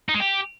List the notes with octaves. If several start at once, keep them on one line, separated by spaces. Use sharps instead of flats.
D#4
G#3
G4